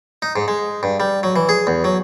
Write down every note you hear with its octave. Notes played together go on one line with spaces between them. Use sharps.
D#4
G#2
G#3
G2
G3
F#3
E3
G#4
E2
F#3